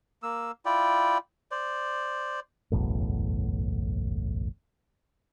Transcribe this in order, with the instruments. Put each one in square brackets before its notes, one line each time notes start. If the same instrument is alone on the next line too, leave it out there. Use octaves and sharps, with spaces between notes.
[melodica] A#3 E6
E4 F4 D5 G5
C5 D5
[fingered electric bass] F#1 B1 E2 A2